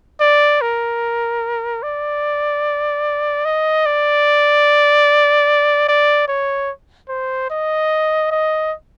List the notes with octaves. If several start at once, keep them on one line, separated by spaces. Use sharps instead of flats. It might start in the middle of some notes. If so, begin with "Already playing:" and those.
D5
A#4
D5
D#5
D5
D5
C#5
C5
D#5
D#5